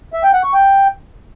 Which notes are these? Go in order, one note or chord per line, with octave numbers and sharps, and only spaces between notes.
E5
G5
F#5
C#6
G5